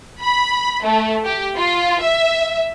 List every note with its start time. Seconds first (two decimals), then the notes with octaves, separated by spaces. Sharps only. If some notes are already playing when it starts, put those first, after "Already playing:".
0.22 B5
0.84 A3
1.23 G4
1.56 F4
2.01 E5